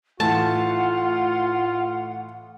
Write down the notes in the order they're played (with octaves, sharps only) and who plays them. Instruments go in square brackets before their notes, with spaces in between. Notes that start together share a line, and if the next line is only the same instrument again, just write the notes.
[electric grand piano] A2 E3 A3 [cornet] F4 [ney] F#5 [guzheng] A5